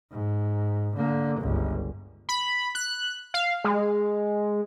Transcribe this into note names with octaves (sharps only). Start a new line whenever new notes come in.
G#2
D3 A#3
G1 C#2
B5
F#6
F5
G#3